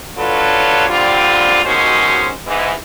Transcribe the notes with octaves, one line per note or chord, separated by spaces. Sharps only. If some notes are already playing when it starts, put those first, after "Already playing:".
F#3 D4 F4 A4 B4 C#5
D3 G3 C4 F4
D#2 B2 F#3 G#3 C#4 C5
G#2 E3